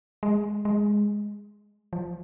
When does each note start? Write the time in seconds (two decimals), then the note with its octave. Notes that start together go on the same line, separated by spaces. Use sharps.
0.23 G#3
0.65 G#3
1.93 F3